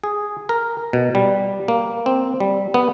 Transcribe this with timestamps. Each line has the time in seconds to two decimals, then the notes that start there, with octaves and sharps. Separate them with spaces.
0.04 G#4
0.49 A#4
0.93 B2
1.15 G3
1.68 A#3
2.06 C4
2.40 G3
2.74 B3